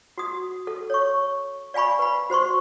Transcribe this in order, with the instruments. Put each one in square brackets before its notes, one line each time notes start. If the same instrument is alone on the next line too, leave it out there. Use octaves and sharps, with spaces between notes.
[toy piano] F#4 D#6
A4
C#5 C#6
D5 F5 G#5 B5 C#6
B4 B5
F#4 C5 C6 C#6